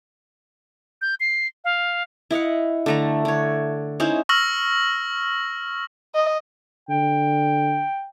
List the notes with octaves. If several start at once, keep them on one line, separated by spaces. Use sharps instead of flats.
G6
C7
F5
E4 D#5 F5 F#5
D3 A3 A#5
D3 C#5
C#4 D#4 E4 C5
C#6 E6 F6 A#6 F#7
D#5
D3 G5